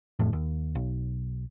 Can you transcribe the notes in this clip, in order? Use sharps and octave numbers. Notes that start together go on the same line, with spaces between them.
A1 F2 A2
D#2
B1